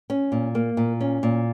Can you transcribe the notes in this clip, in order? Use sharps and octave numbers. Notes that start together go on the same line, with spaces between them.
C#4
A#2
A#3
A#2
C#4
A#2